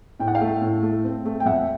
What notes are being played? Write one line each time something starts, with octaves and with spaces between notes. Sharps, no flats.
A2 G5
F#5
F5 G5
A3
A2
A3
C4
A3
G5
F2 E5 F#5